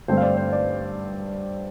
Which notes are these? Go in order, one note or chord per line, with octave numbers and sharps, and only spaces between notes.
G2 D3 A3 C4 C5
F5
D5
C5
D5